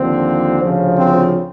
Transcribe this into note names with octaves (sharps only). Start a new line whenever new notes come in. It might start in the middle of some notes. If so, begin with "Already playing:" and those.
Already playing: D#2 D3 F3 C4
D2 C#3 F3
C4